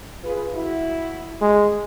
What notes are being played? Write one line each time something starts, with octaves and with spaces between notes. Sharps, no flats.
F4 G#4 B4
E4 F#4
G#3